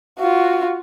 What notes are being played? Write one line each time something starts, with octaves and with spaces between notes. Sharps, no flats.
F4 F#4